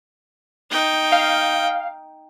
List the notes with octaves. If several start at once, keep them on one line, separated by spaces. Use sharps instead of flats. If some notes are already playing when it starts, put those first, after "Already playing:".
D#4 G5
F5